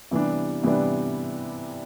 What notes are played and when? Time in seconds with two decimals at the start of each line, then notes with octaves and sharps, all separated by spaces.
0.11 C3 E3 G3 B3 D4
0.63 C3 E3 G3 B3 D4